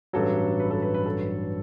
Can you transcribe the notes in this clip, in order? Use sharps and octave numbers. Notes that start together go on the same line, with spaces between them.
A1 G2 F#3 A4
B4
A4
B4
B4
A4